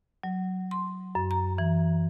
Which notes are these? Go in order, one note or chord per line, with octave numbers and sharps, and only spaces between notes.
F#3
C6
F#2
A#5
E3